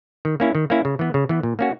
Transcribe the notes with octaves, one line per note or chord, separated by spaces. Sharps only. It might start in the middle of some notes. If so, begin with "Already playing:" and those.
D#3
A#3 C#4 E4
D#3
A#3 C#4 E4
C#3
E3 B3
C#3
E3 B3
A#2
A#3 C#4 F#4